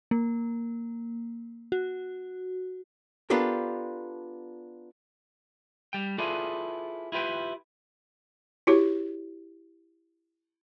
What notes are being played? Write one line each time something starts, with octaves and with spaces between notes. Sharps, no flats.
A#3
F#4
B3 D4 F4 G4 A4 A#4
G3 G5
E4 F4 G#4 A4 B4 D5
E4 F4 G4 B4 G5
E4 F#4 G4 C#5